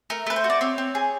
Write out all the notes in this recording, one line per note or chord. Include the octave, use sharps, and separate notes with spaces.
A3 A#4
A3 B4
C5
F#4
D5
C4 C#5
C4
G#4